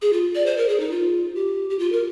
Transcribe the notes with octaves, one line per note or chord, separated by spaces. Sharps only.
G#4
F4
D5
C5
A#4
G#4
D#4
F4
G4
G4
F4
A#4